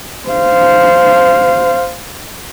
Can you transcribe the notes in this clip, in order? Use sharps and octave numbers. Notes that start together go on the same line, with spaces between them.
C5 F5